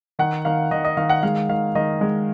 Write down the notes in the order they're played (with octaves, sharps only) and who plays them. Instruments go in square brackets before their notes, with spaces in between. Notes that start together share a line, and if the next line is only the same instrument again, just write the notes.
[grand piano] D#3 F#5
D#3 F5
D#3 D#5
D#5
D#3 F5
F#5
G#3 F5
D#3 F5
D#3 D#5
G#3